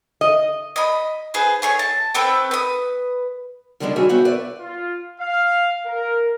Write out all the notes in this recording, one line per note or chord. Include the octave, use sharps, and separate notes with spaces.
D#5
D#5 B5
G#4 B4 C5
A3 G#4 C#5
A5
A3 C4 B4 G5
B4 D#6
D3 D#3 G3 G#3 C#4 D4
G3 F#4 G#4 C#5 E5
B3 F#4 C5 E5 G5
B4 D5 E5
F4
F5
A#4